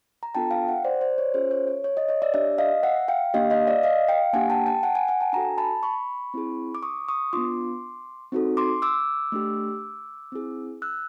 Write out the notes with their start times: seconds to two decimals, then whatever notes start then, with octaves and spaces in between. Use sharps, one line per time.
0.23 A#5
0.35 B3 D4 F4 A4 G5 A5
0.51 F5 G5
0.68 E5 F#5
0.84 C5 D5
1.01 C5 D5
1.18 C#5
1.34 C#4 F4 G#4 C5
1.51 C#5
1.68 C#5
1.84 C#5
1.97 C#5 D#5
2.08 C#5 D#5
2.22 D5 E5
2.34 D4 G4 D5 E5
2.58 D#5 F5
2.83 E5 F#5
3.08 F5 G5
3.34 A#3 D4 G4 D#5 F5
3.50 D#5 F5
3.67 D5 E5
3.83 D#5 F5
4.08 F5 G5
4.33 A#3 D4 G4 F#5 G#5
4.50 G5 A5
4.66 G5 A5
4.83 F#5 G#5
4.95 F#5 G#5
5.08 F#5 G#5
5.21 G5 A5
5.33 D4 F#4 A4 G#5 A#5
5.58 A5 B5
5.83 B5 C#6
6.34 C4 E4 G#4
6.75 D6
6.83 C#6 D#6
7.08 C#6 D#6
7.33 B3 D4 F4 C6 D6
8.32 C4 D#4 F#4 A4
8.57 C6 D6
8.82 D6 E6
9.32 A3 D4 G4
10.32 C4 E4 G#4
10.82 E6 F#6